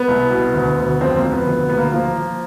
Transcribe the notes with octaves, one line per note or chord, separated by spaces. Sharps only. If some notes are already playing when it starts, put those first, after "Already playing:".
Already playing: B3
C2
B2
D2
D2
F2 C4
A#3
F2
B3
D2 B3
D2 B3
A#3
F3 A#3
F3